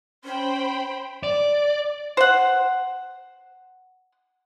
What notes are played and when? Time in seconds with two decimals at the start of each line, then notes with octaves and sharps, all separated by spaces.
0.25 C#4 C5 G5 B5
1.23 D5
2.17 C5 F#5